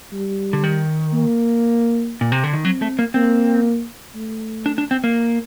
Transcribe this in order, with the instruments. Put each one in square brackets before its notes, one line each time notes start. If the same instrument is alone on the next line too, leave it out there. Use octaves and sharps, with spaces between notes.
[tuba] G3
[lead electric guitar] D3
D#3
[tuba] A#3
[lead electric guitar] A#2
C3
D3
D#3
[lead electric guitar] F#3 [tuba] C4
[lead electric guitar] A3
A#3
[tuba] A#3 [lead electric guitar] C4
[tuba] A3
[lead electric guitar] D4
D4
C4
A#3